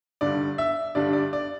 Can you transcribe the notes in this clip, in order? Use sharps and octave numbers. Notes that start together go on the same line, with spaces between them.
G2 D3 G3 D4 D5
E5
G2 D3 G3 D4 D5
D5
D5